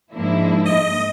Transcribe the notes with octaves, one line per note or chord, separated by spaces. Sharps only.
G#2 F3 A#3 D4 E4
D#5